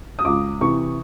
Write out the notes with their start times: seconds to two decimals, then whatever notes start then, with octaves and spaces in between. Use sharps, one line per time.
0.19 D#6
0.25 C#2 D6
0.61 C3 E3 C#6